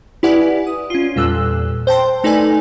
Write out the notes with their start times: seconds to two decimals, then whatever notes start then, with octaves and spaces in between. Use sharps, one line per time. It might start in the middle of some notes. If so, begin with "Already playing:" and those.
0.23 E4 G4 B4 D5 F#5 G#5
0.67 D#6
0.90 C#4 F4
1.16 E2 A#2 G3 A4 E6 F#6
1.87 C5 G5 A5 C6
2.24 A3 D#4 A4 B4 D5 G#5